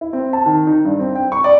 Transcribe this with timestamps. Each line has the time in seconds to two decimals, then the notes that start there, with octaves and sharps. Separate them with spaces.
0.01 E4
0.13 C4
0.33 A5
0.46 D#3
0.67 D#4
0.85 G2
0.99 C4
1.15 G5
1.32 C#6
1.44 D5